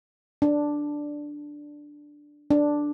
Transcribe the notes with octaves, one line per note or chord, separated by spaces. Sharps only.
D4
D4